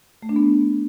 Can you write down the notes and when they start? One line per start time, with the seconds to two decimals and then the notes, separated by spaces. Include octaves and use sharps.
0.22 A3
0.29 D4
0.36 B3